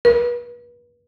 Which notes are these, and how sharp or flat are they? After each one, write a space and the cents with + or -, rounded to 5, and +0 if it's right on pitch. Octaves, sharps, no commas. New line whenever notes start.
B4 -35